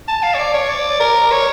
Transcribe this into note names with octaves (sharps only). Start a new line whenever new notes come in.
A5
F5
C#5
D5
C#5
D5
A#4
C#5